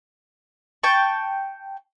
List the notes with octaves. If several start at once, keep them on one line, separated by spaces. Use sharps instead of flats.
G5 A5 C#6